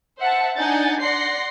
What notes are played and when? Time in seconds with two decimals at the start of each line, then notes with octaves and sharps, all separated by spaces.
0.19 C5 E5 F#5 A5
0.55 D4 D#4 F#5 G#5 G6 A6
1.00 D5 F#5 C6 A#6 C7